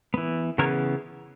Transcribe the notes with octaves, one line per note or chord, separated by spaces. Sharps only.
E3 B3
C#3 E3 B3 A#4 C#5